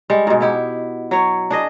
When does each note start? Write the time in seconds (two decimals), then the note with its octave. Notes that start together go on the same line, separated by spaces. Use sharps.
0.10 G3 G#3
0.27 G#2 B2
0.40 B3 E4 G4
1.11 F#3 C#5
1.50 D4 G#4 D#5